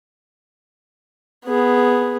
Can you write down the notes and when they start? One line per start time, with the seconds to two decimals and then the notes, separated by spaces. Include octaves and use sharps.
1.46 B3 G#4